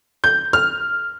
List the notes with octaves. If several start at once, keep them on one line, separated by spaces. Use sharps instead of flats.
G6
F6